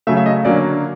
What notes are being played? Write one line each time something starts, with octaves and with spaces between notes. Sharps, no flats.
C#3 F#3 A3 E5
E5
D#5
D3 F#3 A#3 C#4 D5